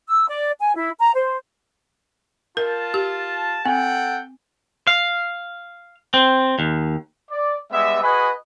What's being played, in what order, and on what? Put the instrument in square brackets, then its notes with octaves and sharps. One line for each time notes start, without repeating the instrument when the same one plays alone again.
[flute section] E6
D5
G#5
E4
A#5
C5
[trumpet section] F4 A5 [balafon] A#4
[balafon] G4
[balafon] C4 [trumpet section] A4 F#5 G5
[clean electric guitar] F5
C4
D#2
[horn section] D5
G3 G#3 B3 E5
F#4 G#4 B4 D#5 G#5 B5